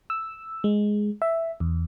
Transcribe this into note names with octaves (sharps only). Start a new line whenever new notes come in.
E6
G#3
E5
E2